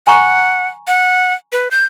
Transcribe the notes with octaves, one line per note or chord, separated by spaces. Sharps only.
F#5 G#5 A#5 C#6
F#5
B4
G6